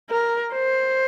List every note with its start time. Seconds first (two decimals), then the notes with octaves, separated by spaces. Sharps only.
0.10 A#4
0.54 C5